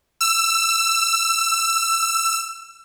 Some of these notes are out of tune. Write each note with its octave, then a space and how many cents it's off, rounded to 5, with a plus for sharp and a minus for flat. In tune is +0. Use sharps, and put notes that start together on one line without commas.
E6 +20